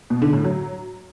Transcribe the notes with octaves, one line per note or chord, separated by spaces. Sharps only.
B2
D3
A2
F#3